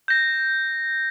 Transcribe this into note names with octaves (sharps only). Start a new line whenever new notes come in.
G6 A#6